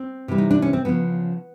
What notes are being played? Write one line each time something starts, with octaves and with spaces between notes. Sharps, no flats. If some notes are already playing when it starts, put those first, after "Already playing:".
Already playing: C4
C3 E3 G3
D#4
D4
C#4
C4
C#3 F3 B3